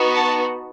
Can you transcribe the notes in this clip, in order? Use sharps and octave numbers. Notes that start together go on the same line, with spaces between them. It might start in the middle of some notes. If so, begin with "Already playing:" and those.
Already playing: B3 D#4 F#4
A5